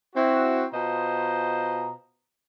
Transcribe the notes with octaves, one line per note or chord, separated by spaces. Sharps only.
C4 E4 F#4
B2 F4 C5 D#5 A#5